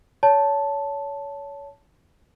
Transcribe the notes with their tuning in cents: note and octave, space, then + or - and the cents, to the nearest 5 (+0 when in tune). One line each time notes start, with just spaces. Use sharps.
C#5 +25 A5 +0